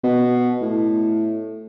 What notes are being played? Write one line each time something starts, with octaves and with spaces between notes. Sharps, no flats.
B2
A2